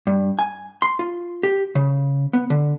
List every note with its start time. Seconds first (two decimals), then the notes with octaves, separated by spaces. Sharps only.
0.07 G2
0.39 G#5
0.82 C6
0.99 F4
1.43 G4
1.75 C#3
2.33 B3
2.50 D3